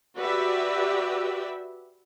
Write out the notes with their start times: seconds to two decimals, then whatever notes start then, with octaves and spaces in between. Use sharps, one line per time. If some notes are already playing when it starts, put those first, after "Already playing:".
0.17 F#4 G4 B4 D5 E5